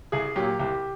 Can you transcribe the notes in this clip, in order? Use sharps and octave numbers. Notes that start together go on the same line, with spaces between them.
C2 G#4
A#2 F#3 G4
C2 G4